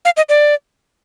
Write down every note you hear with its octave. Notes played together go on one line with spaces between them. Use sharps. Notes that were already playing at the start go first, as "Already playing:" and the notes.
F5
D#5
D5